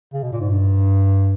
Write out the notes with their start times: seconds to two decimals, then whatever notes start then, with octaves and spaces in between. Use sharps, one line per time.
0.13 C#3
0.23 B2
0.32 A#2
0.40 G#2
0.50 G2